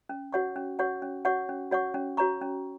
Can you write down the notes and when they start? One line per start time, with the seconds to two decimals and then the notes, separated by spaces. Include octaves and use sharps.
0.09 C#4
0.33 F#4 C#5 F#5 C#6
0.56 C#4
0.79 F#4 C#5 F#5 C#6
1.02 C#4
1.25 F#4 C#5 F#5 C#6
1.49 C#4
1.71 F#4 C#5 F#5 C#6
1.94 C#4
2.17 F#4 C#5 A#5 C#6
2.41 C#4